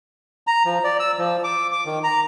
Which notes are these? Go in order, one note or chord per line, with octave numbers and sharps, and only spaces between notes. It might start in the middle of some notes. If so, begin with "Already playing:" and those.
A#5
F3
D5
E6
F3
D6
D6
D#3
A#5